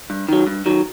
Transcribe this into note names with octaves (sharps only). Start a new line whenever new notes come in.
G2
D#3 F#3
G2
D#3 F#3